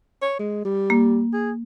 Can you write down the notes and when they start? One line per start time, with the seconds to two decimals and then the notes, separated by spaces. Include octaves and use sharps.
0.22 C#5
0.39 G#3
0.65 G3
0.90 A#3
1.34 G#4